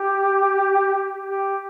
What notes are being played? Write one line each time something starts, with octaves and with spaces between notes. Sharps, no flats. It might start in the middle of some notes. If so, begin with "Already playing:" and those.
Already playing: G4
G4